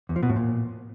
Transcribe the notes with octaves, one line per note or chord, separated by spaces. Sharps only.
E2
F3
B2
A2
A#2